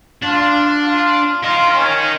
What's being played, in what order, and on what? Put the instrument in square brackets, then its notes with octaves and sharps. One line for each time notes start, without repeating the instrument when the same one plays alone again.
[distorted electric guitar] D4 [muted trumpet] F4
[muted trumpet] F4
[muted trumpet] F4 [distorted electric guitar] A#4 D#5
[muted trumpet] C#4